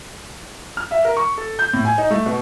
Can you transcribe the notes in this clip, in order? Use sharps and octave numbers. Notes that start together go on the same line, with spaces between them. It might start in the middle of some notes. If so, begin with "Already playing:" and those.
F6
E5
A#4
C#6
A4
G6
A2
G#5
D#4
A3
B2